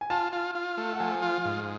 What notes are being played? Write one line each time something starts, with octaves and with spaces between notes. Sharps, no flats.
G#5
F4 A5
F4
F4
A3
F#5
F3 G#5
F4
G#2